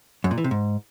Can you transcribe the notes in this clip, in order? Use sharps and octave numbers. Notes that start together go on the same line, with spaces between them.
F#2
A#2
E3
C3
G#2